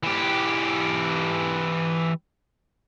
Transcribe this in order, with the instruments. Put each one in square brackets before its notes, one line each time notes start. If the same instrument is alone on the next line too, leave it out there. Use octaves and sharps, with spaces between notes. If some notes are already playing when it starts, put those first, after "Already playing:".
[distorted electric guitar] E3 G4